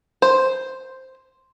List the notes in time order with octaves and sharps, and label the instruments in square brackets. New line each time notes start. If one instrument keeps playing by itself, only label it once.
[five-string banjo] C5